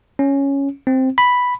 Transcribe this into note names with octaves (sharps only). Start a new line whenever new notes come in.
C#4
C4
B5